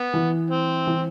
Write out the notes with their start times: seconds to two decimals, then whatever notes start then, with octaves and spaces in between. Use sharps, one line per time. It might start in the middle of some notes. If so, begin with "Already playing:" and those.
Already playing: B3
0.14 E3
0.50 C4
0.87 E3